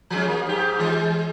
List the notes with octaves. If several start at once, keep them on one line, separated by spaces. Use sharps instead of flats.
F3 G#3 C#4
A#3
G#2 G4
E3 G#3